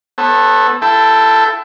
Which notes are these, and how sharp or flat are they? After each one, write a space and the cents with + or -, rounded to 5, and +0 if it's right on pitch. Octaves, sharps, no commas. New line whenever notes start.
B3 +0 A4 +0 C#5 -40
E4 +30 A4 +0 G5 +0